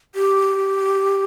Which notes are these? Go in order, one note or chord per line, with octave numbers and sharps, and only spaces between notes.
G4